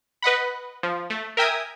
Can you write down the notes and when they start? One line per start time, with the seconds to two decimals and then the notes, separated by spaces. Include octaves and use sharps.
0.22 B4 D#5 F#5 B5
0.83 F3
1.10 A3
1.37 A#4 E5 G5 G#5 D#6